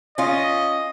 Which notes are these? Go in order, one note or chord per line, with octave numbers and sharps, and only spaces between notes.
C#4 F4 D#5